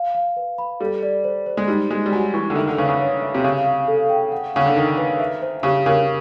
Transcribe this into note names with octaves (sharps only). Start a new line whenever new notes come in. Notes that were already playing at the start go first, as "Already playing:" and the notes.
Already playing: F5
F5
B4
B5
G3 A4
D5
C5
C5
G#3
G3 D#4
G#3 F#4
G3
F#3 G#5
E3 C#6
D3
D#3 E5
D3
C#3 B4
C#3
C#5
E5
C3
C#3 F5
F5
A4
G5
F#5
C#3 F#5
D3
D#3 D4
B4
E5
C5
C#3 G4
C#3 A#4